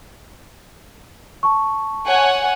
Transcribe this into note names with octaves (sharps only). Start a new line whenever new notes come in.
A5 C#6
C#5 F#5 G#5